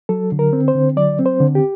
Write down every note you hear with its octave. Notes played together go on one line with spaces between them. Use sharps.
F#3 A4
D3
A#4
C4
C5
D3
F#3 D5
C4
C5
D3
G4